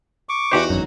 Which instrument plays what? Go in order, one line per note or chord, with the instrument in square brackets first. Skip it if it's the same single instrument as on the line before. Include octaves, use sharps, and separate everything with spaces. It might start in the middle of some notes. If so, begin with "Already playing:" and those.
[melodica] C#6 D6
[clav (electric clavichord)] E2 G4 C5 [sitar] D#4 F#4
[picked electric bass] G#1 F#2 [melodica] F#3